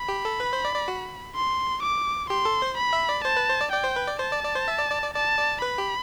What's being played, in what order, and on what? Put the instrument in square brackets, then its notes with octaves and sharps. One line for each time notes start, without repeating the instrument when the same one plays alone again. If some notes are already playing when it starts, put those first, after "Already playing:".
Already playing: [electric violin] B5
[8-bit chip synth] G4
A4
B4
C5
D5
D5
F#4
[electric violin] C6
D6
[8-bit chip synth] G4 [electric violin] C6
[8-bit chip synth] A4
C5
[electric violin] B5
[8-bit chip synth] E5
D5
[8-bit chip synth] C5 [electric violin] A5
[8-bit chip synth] B4
C5
D5
[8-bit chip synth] D5 [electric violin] G5
[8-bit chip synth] C5
B4
D5
[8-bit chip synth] C5 [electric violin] A5
[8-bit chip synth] D5
D5
C5
E5
D5
D5
D5
[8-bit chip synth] D5 [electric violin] A5
[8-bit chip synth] D5
[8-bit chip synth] B4 [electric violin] B5
[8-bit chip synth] G4